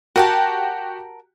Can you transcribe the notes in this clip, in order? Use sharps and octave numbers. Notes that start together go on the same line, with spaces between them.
F#4 G4 A#4 F#5 A5